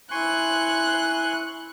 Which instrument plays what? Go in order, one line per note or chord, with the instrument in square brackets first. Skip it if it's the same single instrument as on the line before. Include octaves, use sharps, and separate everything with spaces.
[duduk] E4 [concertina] G#5 C6 C#6 [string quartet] F#6